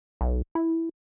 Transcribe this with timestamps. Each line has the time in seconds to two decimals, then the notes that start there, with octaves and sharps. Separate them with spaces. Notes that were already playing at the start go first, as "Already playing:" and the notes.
0.21 B1
0.55 E4